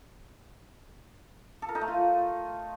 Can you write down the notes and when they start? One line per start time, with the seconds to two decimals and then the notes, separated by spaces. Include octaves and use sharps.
1.62 A4
1.69 A#4
1.75 D#4
1.81 A3
1.88 F4